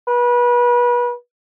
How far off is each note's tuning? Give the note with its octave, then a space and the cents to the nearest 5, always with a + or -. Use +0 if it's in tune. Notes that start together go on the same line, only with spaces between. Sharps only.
B4 -30